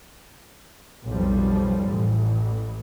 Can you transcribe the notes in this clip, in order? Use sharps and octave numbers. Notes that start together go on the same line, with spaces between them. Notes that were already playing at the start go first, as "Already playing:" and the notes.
B1 F2 F3 G3
A1 E3